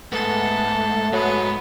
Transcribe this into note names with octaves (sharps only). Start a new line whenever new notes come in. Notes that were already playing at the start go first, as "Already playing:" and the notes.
G#2 A3 B3 A4
G#2 F#3 B3